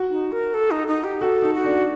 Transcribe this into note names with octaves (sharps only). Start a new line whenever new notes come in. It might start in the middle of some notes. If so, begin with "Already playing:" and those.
Already playing: F#4
D#4
A#4
A4
D#4
D#4
G4
F#4 A4
D#4
F#4
D4